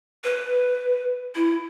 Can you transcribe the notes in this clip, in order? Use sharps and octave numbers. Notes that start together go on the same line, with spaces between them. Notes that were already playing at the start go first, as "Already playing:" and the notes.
B4
E4